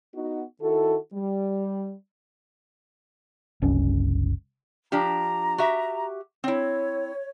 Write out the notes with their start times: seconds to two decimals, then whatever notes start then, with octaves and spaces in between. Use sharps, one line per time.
0.15 B3 D#4 F#4
0.62 D#3 E4 F#4 A4
1.14 G3
3.62 F#1 C2 C#4
4.92 F3 D4 G4 A#5
5.58 F#4 G4 E5
6.44 C4 E4 C#5